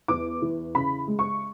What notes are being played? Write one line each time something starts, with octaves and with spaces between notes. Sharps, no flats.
E2 D6
E3
C#3 B5
G#3
C#6